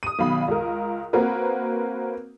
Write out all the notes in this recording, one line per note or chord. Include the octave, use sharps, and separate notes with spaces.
D#6 D#7
B1 B2 D#3 F5 B5
C#2 A#4
A#3 C4 F#4 A#4 B4